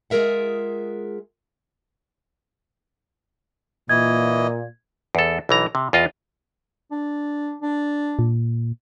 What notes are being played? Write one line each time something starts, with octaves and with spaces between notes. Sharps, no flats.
G#3 F4 G#4 A#4 E5 F#5
A#2 E3 D#5 G#6
E2 A4
B1 E3 A#5
C3
E2 F4 D#5
D4
D4
A#2